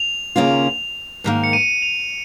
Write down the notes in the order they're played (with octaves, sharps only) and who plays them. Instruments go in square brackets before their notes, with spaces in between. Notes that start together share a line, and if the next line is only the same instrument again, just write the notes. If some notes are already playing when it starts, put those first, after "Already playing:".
Already playing: [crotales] F7
[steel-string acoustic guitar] D#2 C#3 A#3 C#4 F4
G#2 D#3 A#3
[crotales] C#7
D#7
F7